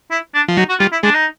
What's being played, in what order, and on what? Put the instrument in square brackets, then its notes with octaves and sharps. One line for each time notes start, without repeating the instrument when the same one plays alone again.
[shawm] E4
D4
[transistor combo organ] F3
[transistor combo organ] F#3 [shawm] D#4
[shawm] F#4
[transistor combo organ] G3 [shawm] F4
[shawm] E4
[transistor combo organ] G#3 [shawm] D4
[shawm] D#4